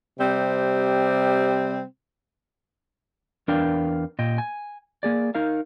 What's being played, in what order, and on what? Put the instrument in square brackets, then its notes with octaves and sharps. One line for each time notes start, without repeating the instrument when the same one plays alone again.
[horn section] C3 G3 C4
[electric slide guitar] E2 D4 A#4 B4 F5 G5
A#2 D#5 G5
G#5
A#3 G#4 D5
D#4 A#4 F5